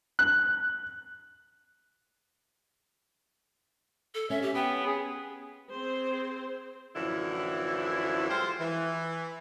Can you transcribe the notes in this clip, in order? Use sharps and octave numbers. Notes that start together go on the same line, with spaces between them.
F#6
A4
C#4 E5
G4
B3 G5
G#4
C4 G#4 C5
F#2 A2 D3 E3 F3 E4
G#3 F4 G4 C5
E3